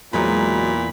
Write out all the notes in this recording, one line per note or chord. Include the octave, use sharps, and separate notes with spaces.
E2 A#2 F#3 G#3 B3 B5